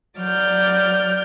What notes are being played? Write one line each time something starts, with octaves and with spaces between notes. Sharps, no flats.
F#3 D5 F6 G6